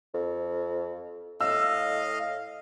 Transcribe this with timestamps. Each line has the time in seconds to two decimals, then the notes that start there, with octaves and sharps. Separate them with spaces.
0.14 F2
1.41 A2 D#5 F5 E6